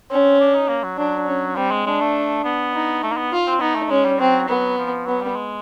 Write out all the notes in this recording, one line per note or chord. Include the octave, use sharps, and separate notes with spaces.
C4 C#4
D4
D#4
A#3
F#3
F#3 D4
C#4
G3 C4
G#3
G#3 D4
A3
B3
D#4
A3
A#3
B3
F4
C4
B3 D#4
A3
G#3 C#4
G3
F#3 C4
F#3 B3
F3
F#3 B3
G3
G#3